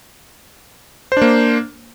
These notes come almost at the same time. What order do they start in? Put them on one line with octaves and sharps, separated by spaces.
C5 D4 A#3